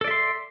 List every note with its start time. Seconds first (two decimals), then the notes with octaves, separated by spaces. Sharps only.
0.01 A4
0.04 D5
0.08 E5
0.11 C6